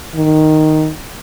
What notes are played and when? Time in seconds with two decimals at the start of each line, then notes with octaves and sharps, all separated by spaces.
0.15 D#3